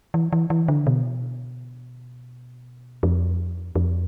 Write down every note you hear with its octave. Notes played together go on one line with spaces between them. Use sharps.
E3
E3
E3
D3
B2
F2
F2